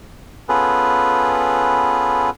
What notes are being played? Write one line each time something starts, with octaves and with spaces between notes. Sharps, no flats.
B3 C#4 F4 G#4 A4 B4